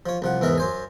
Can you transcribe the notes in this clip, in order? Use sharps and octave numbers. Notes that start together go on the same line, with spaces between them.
F3 C#5
C2 F3 F#5
E2 G#2 E3 A#4 E5
F#2 C5 G#5